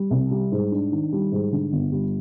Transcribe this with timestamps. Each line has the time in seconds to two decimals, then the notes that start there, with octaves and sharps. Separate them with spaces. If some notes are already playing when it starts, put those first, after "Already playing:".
Already playing: G3
0.11 C2
0.31 G3
0.52 G#2
0.72 D4
0.92 D#3
1.12 G3
1.32 G#2
1.52 D3
1.72 G1
1.92 G3